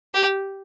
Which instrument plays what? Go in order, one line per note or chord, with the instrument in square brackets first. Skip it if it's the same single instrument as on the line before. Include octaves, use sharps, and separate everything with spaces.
[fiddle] G4